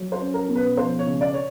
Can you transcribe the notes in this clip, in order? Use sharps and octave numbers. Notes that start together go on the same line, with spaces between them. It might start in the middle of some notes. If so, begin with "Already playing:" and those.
Already playing: F#3
C5
C#4
A#4
B2
B4
F3 C5
C#5
C#3
D5
C#5